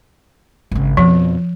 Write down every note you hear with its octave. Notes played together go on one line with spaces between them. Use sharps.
G#1 C#3
F2 B2 F3